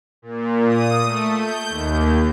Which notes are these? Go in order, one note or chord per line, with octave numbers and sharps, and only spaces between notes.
A#2
D#6
A3
G6
D#2